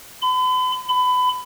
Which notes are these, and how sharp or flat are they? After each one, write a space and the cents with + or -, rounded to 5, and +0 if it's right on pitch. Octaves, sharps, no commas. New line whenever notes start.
B5 +40
B5 +25